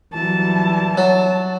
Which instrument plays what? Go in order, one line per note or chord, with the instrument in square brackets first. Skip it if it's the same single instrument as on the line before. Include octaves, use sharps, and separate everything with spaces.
[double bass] E3 G3 [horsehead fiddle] F#3 A5
[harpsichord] F#3 [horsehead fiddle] A5